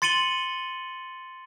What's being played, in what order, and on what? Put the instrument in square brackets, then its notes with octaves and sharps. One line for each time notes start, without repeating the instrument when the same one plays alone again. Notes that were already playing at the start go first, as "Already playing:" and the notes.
[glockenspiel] C6 A6 C#7 D#7 F#7 G7